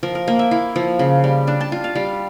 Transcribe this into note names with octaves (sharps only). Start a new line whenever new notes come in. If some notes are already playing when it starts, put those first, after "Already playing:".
F3 A#4
A#4
A#3
E5
E4 F5
F3
C#3
G3
D4 A5
A5
F4
F5
G3 F5